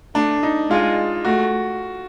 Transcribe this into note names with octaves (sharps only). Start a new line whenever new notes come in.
A3 D4
D#4
G#3 F4
A3 F#4